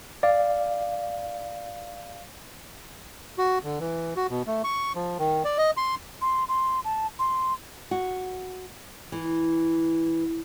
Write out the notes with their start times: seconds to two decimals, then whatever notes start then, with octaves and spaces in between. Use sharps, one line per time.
0.23 D5 F5
3.38 F#4
3.64 D3
3.80 E3
4.16 F#4
4.29 B2
4.47 A3
4.64 C#6
4.95 F3
5.19 D#3
5.45 D5
5.58 D#5
5.77 C6
6.22 C6
6.49 C6
6.85 A5
7.19 C6
7.91 F#4
9.12 E3